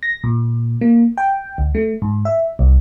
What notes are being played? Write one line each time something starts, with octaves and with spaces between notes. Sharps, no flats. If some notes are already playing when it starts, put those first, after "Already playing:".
A#6
A#2
A#3
G5
D2
A3
G#2
E5
C2